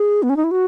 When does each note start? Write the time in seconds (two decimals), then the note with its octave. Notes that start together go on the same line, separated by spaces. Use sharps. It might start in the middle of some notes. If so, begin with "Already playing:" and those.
Already playing: G#4
0.23 B3
0.29 C#4
0.36 D#4
0.44 E4
0.51 F#4